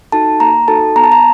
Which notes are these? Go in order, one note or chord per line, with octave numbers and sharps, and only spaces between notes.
D#4 F#4 A4 A5
A#3 A#5
D#4 F#4 A4 A5
B3 A#5
A5
A#5